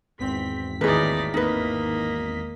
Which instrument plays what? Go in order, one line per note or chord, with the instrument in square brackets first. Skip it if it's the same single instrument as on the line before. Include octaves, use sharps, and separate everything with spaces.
[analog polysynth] G#1 E2 B6 [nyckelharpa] C4
[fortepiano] D#2 A2 [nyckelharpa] D#4 D5 [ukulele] G#4 B4
[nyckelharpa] A#3 D#5 [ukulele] D#4 B4